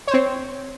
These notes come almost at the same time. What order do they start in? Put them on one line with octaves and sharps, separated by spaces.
C#5 C5 C4